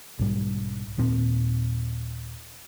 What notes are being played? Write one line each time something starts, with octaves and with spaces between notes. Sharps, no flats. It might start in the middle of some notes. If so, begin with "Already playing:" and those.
B1 G#2 G3
D#1 A#2 C4